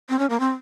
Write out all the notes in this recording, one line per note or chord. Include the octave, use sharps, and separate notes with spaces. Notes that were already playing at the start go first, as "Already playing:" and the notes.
C4
C#4
A#3
C4